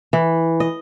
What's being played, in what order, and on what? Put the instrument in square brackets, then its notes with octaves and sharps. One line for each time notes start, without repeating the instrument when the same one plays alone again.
[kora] E3
D#5